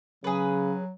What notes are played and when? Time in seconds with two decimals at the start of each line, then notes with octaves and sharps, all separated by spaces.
0.24 C#3 F#3 G#4 B4